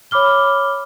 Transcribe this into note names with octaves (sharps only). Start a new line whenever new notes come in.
C#5 B5 D6 F6 G7